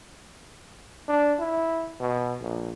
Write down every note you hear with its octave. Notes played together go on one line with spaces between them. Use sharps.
D4
E4
B2
A#1